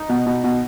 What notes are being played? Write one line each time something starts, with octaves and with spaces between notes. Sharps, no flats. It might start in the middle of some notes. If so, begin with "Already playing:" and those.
Already playing: D#4
B2
B2
B2